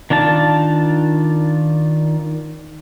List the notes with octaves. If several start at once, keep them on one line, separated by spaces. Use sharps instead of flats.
D#3 D4 F4 A5